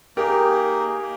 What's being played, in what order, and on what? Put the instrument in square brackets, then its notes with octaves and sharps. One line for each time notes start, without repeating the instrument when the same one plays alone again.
[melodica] A#3 D#4 G#4 [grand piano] G4 A#4
[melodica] A#3